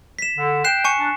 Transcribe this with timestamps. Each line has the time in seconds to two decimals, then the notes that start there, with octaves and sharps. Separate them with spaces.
0.19 B6 E7
0.37 D3
0.64 G5 F#6 C7 E7
0.84 G#5 C#6 C#7
0.98 D4